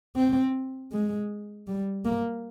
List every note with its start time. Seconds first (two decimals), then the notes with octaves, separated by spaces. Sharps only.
0.16 C4
0.92 G#3
1.68 G3
2.05 A#3